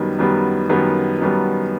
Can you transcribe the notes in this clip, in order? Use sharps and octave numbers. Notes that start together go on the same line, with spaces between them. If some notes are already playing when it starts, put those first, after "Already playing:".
Already playing: F#2 D#3 G3 B3
F#2 D#3 G3 B3
F#2 D#3 G3 B3
F#2 D#3 G3 B3